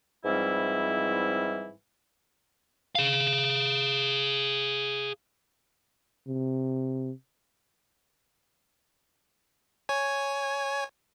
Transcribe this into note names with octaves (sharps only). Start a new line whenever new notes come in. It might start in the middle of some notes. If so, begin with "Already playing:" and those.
G#2 E3 F3 G3 C4 E4
G#4 F5
C3
C#5 G#5